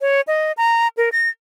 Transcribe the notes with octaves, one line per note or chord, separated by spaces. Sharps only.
C#5
D#5
A#5
A#4
A#6